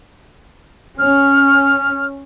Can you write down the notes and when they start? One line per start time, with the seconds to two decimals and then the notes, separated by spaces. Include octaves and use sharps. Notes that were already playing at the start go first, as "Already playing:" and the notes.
0.99 C#4 F6